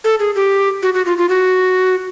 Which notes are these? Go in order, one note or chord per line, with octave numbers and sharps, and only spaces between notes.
A4
G#4
G4
F#4
F#4
F4
F4
F#4